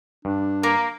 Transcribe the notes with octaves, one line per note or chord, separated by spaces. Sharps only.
G2 D4
A#3 A#4 D6